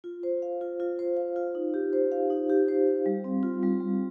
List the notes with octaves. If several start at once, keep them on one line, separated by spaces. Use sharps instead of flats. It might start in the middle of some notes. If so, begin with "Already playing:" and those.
F4
C5
F5
F4
F4
C5
F5
F4
D#4
G4
C5
F5
D#4
G4
C5
F5
G3
C4
F4
G3
G3